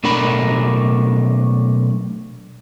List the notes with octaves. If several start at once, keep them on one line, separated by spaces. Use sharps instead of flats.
B1 A3 D4 A#4 B5